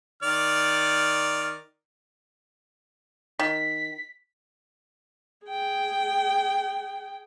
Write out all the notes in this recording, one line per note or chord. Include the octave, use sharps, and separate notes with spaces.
D#3 D5 F6
D#3 B6
G#4 G5